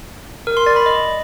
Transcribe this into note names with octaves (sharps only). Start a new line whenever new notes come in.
A#4
C6
D5
B5
D#5